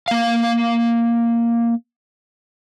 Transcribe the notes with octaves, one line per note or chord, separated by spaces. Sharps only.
A#3 F5